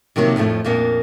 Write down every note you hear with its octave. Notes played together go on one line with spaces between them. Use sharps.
C3 D#3 F3 F#3 A#3
F2 A2 F3 A3
F2 A#2 A#3 B3 D4